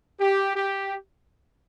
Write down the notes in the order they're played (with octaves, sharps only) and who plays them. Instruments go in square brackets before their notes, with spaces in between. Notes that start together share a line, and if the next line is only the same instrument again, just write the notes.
[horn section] G4
G4